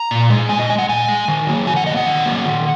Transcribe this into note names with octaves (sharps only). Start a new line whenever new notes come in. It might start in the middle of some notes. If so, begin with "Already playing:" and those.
Already playing: A#5
A#2
G#3
A#2 G#5
D#5
G#3 G#5
F#5
A#2 G#5
G#3
D#3
F#3 A#3
D#3 G#5
F#5
F#3 A#3 D#5
F#5
D#3
F#3 A#3
D#3